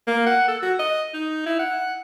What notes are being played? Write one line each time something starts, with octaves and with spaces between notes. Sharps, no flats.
A#3
F#5
A4
F#4
D#5
D#4
E4
F#5